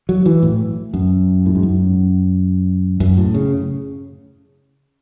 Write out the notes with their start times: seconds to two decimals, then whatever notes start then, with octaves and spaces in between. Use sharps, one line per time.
0.09 F#3
0.26 E3
0.43 A2
0.94 F#2
1.46 A2
1.55 G#2
1.63 F#2
3.00 F#2
3.17 A2
3.34 C#3